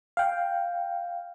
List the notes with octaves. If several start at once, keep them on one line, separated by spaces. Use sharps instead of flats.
F5 G5